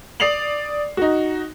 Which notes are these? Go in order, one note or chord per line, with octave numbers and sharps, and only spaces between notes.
D5 D#6 C7 F7 F#7
D#4 F#4